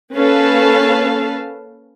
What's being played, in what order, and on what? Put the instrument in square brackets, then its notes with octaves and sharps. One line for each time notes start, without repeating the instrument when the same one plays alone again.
[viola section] A#3 C#4 A4 B4 F5 A5